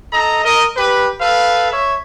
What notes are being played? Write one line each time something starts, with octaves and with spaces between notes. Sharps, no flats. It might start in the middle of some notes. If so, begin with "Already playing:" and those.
A4 D#5 A#5
A#4 D#5
G4 B4
A4 B4 F5
C#5 E5